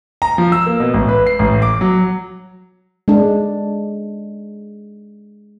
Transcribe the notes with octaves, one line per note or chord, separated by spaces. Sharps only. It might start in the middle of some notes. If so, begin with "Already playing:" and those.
A#5
F3
E6
A#3
B2
A1
B4
C7
A1
D6
F#3
G#3 D4